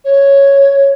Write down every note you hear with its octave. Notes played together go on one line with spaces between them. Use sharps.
C#5